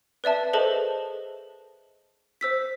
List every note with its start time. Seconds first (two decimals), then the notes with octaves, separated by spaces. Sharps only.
0.24 B4 D5 E5 A5
0.53 G#4 A4 B4 C5 D#5 A5
2.41 C5 E6 B6